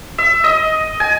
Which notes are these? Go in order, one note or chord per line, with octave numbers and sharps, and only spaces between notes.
E5
D#5
G#5